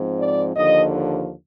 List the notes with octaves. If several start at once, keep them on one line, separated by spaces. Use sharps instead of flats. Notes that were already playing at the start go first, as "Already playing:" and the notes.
Already playing: G#2 F3 C4
D5
D#2 D3 F3 D#5